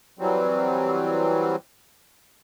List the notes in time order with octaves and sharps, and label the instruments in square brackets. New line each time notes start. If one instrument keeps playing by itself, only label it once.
[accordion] E3 F#3 G3 C4